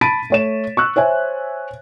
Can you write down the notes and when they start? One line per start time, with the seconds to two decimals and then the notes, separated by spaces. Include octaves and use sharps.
0.01 A5 B5 A6 B6 D7 D#7
0.30 A3 C#5 E7
0.77 C#6 E6 F#6
0.96 C5 C#5 E5 G#5